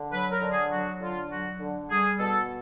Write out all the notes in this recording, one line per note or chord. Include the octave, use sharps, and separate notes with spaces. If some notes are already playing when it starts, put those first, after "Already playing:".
Already playing: D3
F#3 B4
A#4
D3
G#4
F#3 F#4
D3 F4
F#3 F#4
D3
G3 G#4
B2 A4